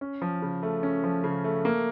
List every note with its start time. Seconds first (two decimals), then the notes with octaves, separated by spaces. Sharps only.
0.01 C#4
0.22 F3
0.42 C#3
0.63 A3
0.83 C#4
1.04 F3
1.24 C#3
1.44 A3
1.65 A#3